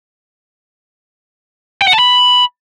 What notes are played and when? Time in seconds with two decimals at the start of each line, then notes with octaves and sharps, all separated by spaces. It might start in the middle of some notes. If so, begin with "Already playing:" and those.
1.82 G5
1.88 F#5
1.93 A5
1.99 B5